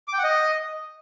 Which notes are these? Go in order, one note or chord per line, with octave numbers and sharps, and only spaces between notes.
D6
G5
F#5
D#5